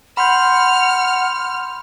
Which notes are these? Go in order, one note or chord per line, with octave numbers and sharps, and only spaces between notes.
F#5 B5 C6 F6 G6